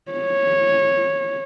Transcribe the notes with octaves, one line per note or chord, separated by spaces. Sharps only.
C#5